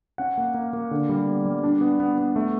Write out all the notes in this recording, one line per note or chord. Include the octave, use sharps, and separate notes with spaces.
C#4 F#5
A#3
A#3
A#3
D3
G3
B3
G3
D4
B3
B3
B3
A3